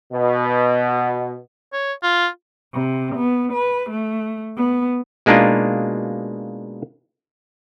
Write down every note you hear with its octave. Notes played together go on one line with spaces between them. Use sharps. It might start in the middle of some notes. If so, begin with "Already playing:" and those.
B2
C#5
F4
C3
B3
B4
A3
B3
B2 G#3 A#3 D4 D#4 F4